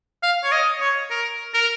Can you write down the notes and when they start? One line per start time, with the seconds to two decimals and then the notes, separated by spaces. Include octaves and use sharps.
0.23 F5
0.44 C#5
0.52 D#5
0.80 C#5
1.10 A#4
1.54 A#4